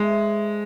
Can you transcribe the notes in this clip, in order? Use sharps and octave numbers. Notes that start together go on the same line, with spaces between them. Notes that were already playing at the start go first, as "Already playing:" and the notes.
Already playing: G#3 A3 E4 A4 E5
C5